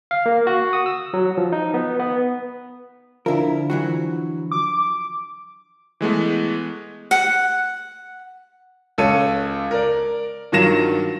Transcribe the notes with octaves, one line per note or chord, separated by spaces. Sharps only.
F5
A#3
F#4
D#6
E6
F#3
F3
D#4
B3
B3
D3 F3 E4 A#4
E3 F#3 F#4
D6
E3 G#3 A3 B3
F#5
C#2 A4 C#5 D#7
A#4 D5
G2 D#3 F#3 F4 A#6 E7